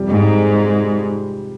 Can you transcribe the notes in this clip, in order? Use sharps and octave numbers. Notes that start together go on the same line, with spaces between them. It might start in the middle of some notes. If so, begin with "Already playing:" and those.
Already playing: F2 C3 G3
G#2